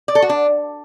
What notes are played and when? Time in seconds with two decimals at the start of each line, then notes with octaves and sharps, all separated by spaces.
0.08 D5
0.15 A4
0.22 F#4
0.29 D4